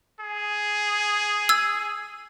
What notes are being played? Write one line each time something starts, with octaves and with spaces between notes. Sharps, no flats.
G#4
E6 G#6